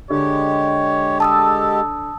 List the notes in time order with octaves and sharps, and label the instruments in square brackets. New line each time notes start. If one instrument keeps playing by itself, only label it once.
[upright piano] D3 [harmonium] G#3 G4 [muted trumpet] C#5
[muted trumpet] A4 [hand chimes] A5 D#6 E6